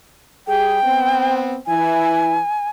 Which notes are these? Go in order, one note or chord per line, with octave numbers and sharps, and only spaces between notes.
G3 G4 G#4 G5
B3 C4
E3 E4 G#5